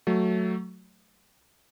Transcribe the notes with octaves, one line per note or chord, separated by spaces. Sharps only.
F#3 A3